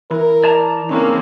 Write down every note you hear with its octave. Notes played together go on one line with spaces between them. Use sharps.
E3 E4 A#4
D5 A5 A#5
C#3 E3 A#3 C4 C#4 D#4